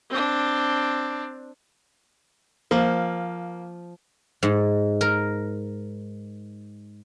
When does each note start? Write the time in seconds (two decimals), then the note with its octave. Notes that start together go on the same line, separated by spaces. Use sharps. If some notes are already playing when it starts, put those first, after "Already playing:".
0.10 C4 D4
2.71 F3 A#3
4.43 G#2
5.01 A#4